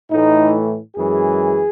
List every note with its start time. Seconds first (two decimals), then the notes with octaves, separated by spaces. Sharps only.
0.11 A2 E3 A3 D#4
0.95 F#2 E3 G#3 G#4